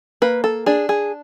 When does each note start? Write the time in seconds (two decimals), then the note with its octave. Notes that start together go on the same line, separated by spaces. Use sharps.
0.22 A#3 B4
0.44 A4
0.66 D4 G#4
0.89 G#4